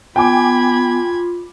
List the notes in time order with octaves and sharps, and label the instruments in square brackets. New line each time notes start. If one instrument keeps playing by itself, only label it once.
[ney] B3 [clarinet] F4 [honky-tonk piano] G5 G#5 D6 [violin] B5 G#6